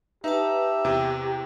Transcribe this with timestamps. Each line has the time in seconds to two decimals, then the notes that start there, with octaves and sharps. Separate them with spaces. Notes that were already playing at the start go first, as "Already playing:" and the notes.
0.24 D#4 G4 B4 E5 A5
0.85 E2 C3 C5 G5